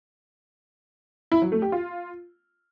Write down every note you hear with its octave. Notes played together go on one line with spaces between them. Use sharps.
E4
F#3
A3
G4
F4